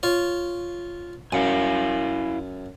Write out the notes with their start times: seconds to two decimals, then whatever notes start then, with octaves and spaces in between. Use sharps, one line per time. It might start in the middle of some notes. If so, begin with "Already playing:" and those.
0.03 F4 C#5
1.32 F#2 E4 F5 G#5